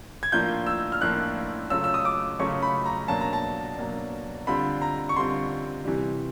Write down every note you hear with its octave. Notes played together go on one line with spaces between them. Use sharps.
G#6
A2 F3 A#3 D4 F4 G6
E6
F6
A2 F3 A#3 D4 F4 F#6
C#3 F#3 A3 C#4 F4 E6
E6
D#6
D6
C#3 F#3 A3 C#4 F4 C#6
B5
A#5
B2 F#3 A#3 D4 A5
A#5
A5
B2 F#3 A#3 D4
D3 G3 C4 F4 B5
A#5
C#6
D3 G3 C4 F4 C6
C3 E3 G3